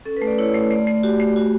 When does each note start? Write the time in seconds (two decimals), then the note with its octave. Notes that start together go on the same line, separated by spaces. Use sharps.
0.05 C#4 A4
0.17 B4
0.22 A3
0.27 D5
0.39 E4 C#5
0.54 A3
0.71 A3 D5
0.87 A3
1.03 F#4 G4
1.20 A3
1.36 F#4